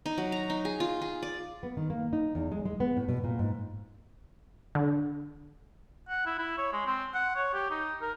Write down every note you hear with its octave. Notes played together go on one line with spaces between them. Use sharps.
D#4
F#3
A#5
D#4
G#4
F4
G#4
D5
B3
D#3
A#3
D#4
E2
G#3
G#3
B3
A2
B2
A#2
G#2
D3
F#5
E4
E4
C#5
G#3
C4
F#5
C#5
G4
D#4
A#4